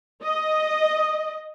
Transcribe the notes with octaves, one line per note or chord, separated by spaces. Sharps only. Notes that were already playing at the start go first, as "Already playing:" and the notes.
D#5